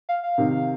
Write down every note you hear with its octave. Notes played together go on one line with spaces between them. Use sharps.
F5
F5
C3 D#3